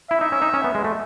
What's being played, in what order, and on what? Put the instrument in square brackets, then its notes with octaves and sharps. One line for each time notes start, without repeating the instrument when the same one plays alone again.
[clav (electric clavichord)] E4 [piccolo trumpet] E5
[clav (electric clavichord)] D#4
C#4
D#4
C#4
B3
G#3
A3